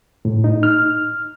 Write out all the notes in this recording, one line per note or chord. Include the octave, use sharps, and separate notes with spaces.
A2
D#4
F6